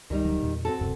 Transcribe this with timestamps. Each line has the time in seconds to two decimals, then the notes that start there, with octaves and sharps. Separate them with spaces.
0.10 C#2 D#3 G3 D#4
0.24 D1 D2 F#3
0.42 E2 A#2
0.65 C4 F#4 A4
0.79 D1 F#2 C3